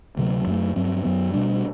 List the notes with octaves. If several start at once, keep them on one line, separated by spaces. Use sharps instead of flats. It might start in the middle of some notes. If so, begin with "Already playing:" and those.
D2 C3 F#3
F#2 F#3 A3
G2 F#3 C4
F#2 F#3 B3
B2 G3 D4